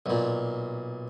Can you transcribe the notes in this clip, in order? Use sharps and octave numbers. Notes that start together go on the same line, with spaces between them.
B1 A#2